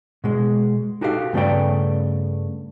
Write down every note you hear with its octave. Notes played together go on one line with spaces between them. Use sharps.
B2 G#3
D#4 F#4 G4 A4 C#5 F5
G2 C#3 A3 B3 D5 G5